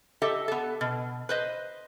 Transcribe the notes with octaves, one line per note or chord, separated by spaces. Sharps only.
G4 A4 D#5 E5
B3 A4
B2
B4 C5 D#5